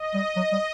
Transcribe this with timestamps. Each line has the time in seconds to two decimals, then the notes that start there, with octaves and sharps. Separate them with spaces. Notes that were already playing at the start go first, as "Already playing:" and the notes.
Already playing: D#5
0.14 G3
0.36 F#3
0.52 G3